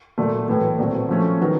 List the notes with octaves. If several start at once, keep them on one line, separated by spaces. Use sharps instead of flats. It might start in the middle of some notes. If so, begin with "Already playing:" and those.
A#2 F#3 A3
A2 E3 A3
A#2 F#3 A3 C4
F3 A3 C#4
D#3 F#3 B3